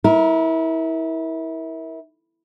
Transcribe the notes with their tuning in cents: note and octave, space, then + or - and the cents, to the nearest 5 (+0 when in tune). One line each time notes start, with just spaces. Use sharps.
E4 -25 A#4 +15